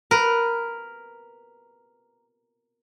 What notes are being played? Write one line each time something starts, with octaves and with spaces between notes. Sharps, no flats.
A#4 B4